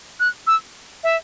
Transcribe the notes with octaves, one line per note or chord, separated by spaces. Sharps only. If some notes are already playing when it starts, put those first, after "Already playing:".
F#6
E6
E5